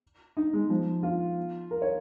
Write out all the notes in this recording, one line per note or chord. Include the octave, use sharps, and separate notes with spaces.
D#4
G#3
F3
F4
A#4
C#5